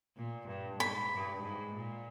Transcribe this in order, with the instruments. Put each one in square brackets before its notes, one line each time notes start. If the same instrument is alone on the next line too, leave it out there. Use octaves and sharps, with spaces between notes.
[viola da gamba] A#2
G2
[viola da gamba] G#2 [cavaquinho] B5
[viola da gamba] G2
G#2
A#2